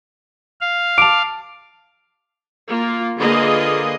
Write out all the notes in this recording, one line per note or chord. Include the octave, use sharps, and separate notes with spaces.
F5
A5 D6 D7 F7
A#3 F4
D3 A#3 F4 G#4 B4 D#5